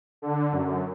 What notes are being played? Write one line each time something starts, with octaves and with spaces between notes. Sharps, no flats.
D3
F#2